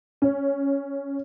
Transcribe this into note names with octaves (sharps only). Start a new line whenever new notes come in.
C#4